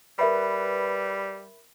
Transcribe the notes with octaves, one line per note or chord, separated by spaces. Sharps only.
G3 A#4 B4 E5 B5